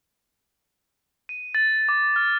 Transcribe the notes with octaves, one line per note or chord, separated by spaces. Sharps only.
D#7
A6
D6
F6